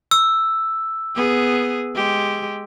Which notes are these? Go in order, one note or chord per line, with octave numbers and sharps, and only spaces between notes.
E6
B3 G#4
G#3 G4